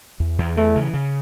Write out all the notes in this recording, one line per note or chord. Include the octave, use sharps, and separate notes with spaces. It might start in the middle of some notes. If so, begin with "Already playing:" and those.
E2
E2
E3 A3
C#3
C#3